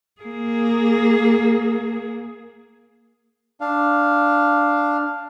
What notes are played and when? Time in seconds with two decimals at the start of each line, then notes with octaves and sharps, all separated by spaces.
0.21 A#3 G#4
3.61 D4 F5